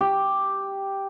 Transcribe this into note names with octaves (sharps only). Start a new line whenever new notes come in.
G4